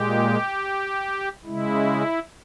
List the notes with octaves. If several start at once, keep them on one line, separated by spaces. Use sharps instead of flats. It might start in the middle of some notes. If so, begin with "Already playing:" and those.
Already playing: A#2 G#3 G4
C#3 G#3 E4